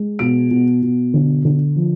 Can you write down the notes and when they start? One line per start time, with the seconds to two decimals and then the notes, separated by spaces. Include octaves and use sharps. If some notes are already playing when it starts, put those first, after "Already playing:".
Already playing: G#3
0.19 B2 D7
0.51 B2
0.82 B2
1.14 D3
1.45 D3
1.76 F3